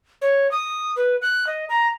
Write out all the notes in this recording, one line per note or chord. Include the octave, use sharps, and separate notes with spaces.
C#5
D#6
B4
F#6
D#5
A#5